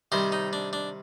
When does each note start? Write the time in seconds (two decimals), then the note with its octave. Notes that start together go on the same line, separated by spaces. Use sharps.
0.12 C3 D#3 G3 C5
0.32 D#4
0.53 D4
0.73 D4